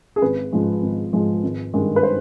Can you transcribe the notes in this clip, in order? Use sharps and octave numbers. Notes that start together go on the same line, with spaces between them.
G#4
G#1 B4
G#2 F3 G#3
G#1
G#2 F3 G#3
G#1
G2 D#3 G#3
B4
C5